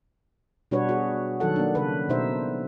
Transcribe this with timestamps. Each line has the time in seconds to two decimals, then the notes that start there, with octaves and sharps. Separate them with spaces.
0.71 B2 G3 D4 F#4 B4 C#5
0.89 F#4 G#4
1.40 D#3 F#3 A4 F#5
1.56 A#3 D4
1.75 C#3 B4
2.09 B2 D#4 C5 E5